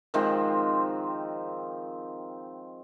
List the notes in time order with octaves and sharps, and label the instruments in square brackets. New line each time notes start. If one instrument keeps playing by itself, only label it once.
[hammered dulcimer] D#3 F3 G#3 C4